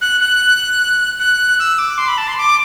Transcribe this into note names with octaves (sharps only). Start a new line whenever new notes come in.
F#6
F#6
F#6
E6
D6
C6
B5
A5
C6
D6